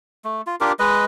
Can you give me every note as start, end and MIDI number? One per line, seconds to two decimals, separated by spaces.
0.25 0.42 57
0.47 0.56 65
0.61 0.72 62
0.61 0.72 65
0.61 0.72 67
0.61 0.72 70
0.79 1.05 56
0.79 1.05 71
0.79 1.05 75